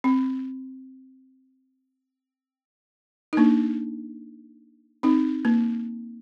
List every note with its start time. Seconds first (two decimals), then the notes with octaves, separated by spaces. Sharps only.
0.04 C4
3.33 D#4
3.37 A#3 D4
5.03 C4 D#4
5.45 A#3